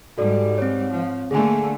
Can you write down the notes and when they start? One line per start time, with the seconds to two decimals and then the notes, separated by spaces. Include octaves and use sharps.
0.18 G#2 G3 F#4 A4 D5
0.58 C4 C#5
0.93 F3
1.31 D3 A3 A#3 G#4 G#5